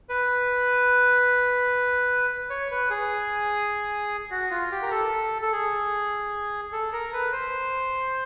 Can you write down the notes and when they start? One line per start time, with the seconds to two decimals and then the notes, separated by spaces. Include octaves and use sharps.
0.09 B4
2.50 C#5
2.71 B4
2.90 G#4
4.31 F#4
4.51 F4
4.72 G4
4.82 A#4
4.91 A4
5.42 A4
5.52 G#4
6.72 A4
6.93 A#4
7.13 B4
7.32 C5